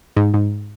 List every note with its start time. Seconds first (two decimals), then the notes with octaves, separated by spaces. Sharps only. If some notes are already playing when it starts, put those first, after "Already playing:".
0.17 G#2
0.34 G#2